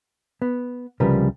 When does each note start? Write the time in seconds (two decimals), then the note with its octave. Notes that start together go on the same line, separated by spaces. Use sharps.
0.42 B3
1.00 C2 C#3 F3 G3 A#4 B4